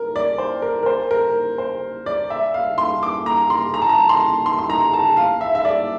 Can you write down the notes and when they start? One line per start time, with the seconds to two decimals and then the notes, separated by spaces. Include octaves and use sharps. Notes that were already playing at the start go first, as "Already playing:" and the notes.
Already playing: A#4
0.16 D5
0.38 C5
0.62 A#4
0.83 A#4
0.86 C5
1.11 A#4
1.58 C5
2.06 D5
2.30 E5
2.54 F5
2.78 C6
3.03 D6
3.26 A#5
3.50 C6
3.74 A#5
3.82 A5
3.89 A#5
4.09 C6
4.46 C6
4.59 C6
4.70 A#5
4.94 A5
5.17 F5
5.41 E5
5.55 E5
5.65 D5